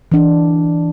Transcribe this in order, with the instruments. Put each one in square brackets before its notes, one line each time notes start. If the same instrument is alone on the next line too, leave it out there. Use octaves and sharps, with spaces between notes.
[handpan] E3 D4